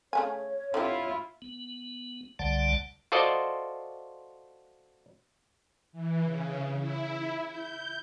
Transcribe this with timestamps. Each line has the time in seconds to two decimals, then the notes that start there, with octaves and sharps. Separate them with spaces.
0.13 C#3 A3 C#5 G#5
0.74 D3 C4 E4 F4 G4
1.42 B3
2.39 C2 D3 G3 D5 F#5 A5
3.12 F4 F#4 A4 C5 D5 D#5
5.92 E3
6.23 C#3
6.79 E4
7.49 G6